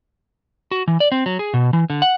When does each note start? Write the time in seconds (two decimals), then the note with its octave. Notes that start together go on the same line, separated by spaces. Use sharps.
0.71 F#4
0.88 E3
1.00 D5
1.12 C4
1.26 F#3
1.39 G#4
1.54 B2
1.73 E3
1.90 D3
2.02 F#5